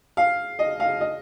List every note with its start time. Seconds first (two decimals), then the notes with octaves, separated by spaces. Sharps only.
0.17 F5
0.59 D#5
0.80 F5
1.01 D#5